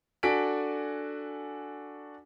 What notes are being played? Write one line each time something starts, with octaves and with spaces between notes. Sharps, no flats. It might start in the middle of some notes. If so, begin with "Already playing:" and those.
D4 F#4 A4 G#5 B6 D7